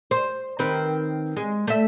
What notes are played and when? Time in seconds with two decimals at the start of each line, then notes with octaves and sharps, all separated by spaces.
0.11 C5
0.59 D#3 C4 B4
1.36 G#3
1.67 A3 E5